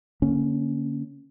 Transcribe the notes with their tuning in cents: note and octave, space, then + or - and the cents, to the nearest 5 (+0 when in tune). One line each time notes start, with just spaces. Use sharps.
D3 -20 A#3 +0 C#4 +5